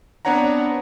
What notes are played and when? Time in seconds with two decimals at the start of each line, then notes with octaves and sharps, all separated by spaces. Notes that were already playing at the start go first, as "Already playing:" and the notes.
0.25 B3 C4 D4 C#5 F#5 A#5